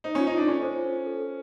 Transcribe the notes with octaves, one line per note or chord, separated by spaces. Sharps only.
D#4 C5
C#4 F4
D#4
D4 F4
C#4 A4
C5
F4
F4
A4
C5